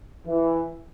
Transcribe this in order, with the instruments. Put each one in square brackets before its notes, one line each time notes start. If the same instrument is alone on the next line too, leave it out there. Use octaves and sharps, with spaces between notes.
[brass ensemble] E3